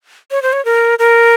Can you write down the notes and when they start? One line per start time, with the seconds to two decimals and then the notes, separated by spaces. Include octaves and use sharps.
0.31 C#5
0.43 C5
0.53 C#5
0.65 A#4
0.99 A#4